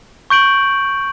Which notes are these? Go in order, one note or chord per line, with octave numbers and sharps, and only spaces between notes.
C#6 G6 D7 F#7